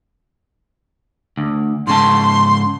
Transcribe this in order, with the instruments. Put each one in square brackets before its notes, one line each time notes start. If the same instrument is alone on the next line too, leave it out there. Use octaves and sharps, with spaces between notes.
[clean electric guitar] D2
[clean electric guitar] G#2 C#3 A5 [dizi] C6